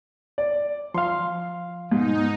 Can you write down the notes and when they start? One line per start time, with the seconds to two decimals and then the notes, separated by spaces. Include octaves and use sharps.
0.38 D5
0.94 F3 F5 C6
1.92 G#2 B2 D#4